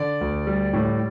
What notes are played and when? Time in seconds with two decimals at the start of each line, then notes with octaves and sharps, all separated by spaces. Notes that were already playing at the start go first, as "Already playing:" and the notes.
Already playing: D3 D5
0.21 D2
0.47 G3
0.73 A2